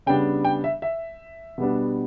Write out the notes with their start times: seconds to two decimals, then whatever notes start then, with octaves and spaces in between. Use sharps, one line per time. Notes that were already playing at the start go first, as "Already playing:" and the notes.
0.06 C#3 G3 B3 D4 G5
0.45 G5
0.64 E5
0.82 E5
1.58 B2 G3 B3 D4